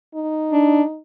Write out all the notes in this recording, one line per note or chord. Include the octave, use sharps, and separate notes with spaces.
D#4
D4